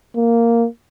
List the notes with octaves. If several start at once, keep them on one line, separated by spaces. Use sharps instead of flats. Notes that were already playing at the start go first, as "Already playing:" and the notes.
A#3